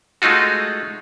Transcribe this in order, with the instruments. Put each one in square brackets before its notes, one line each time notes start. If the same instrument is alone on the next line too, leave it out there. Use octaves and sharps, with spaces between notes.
[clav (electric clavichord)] G#3 A3 D#4 F4 F#4